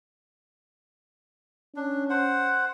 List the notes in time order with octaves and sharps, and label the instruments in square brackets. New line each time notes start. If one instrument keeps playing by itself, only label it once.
[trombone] C#4 [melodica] D4
[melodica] C5 F#5